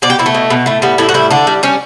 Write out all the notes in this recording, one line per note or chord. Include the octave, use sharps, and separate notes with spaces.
B2 D5
G4
B2 E4
A3
B2
B2
A2 A3
G3 B3
A2 E4
F#4
G3 E4
D3 D4
G3
G3 C#4